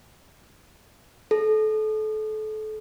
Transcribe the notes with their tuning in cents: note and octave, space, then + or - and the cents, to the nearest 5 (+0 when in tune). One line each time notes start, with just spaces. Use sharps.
A4 -30